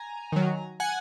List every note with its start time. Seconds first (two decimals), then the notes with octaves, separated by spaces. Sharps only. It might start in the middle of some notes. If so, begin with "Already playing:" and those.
Already playing: G#5 A#5
0.32 D#3 F#3
0.80 F#5 G#5